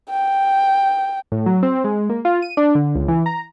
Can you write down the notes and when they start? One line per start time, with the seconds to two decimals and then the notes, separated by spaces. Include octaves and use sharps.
0.10 G5
1.32 A2
1.46 F#3
1.63 C4
1.84 G#3
2.09 A#3
2.25 F4
2.42 D#7
2.57 D4
2.75 D3
2.95 C#2
3.08 E3
3.26 A#5